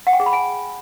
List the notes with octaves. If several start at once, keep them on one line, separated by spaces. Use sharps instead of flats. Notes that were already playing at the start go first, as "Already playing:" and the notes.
F#5
G5
G#4
B5
G#5